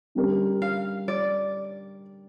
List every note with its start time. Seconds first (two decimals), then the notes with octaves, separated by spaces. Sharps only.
0.15 D3 G3 C#4 G4 A#4
0.62 F5
1.08 D5